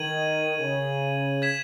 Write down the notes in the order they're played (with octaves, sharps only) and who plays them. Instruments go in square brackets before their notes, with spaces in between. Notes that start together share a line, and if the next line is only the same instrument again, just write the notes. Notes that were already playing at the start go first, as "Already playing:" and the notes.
Already playing: [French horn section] D#3 [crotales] G#6 D#7 F#7
[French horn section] C#3
[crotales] G#6 B6 E7